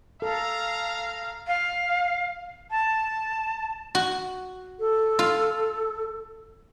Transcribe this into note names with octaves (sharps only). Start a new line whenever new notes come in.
A4 F5 A#5
F5
A5
F#4
A4
F4